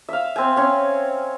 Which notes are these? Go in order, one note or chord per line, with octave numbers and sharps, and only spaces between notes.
E5 F5
C4 G#5
C4 C#4